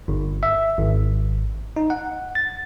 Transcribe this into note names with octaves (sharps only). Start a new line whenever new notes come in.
G1
E5
G#1
D#4
F#5
A6